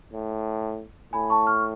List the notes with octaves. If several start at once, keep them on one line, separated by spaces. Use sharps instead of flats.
A2
A2 G#5 B5
A5 C#6
C#6 F6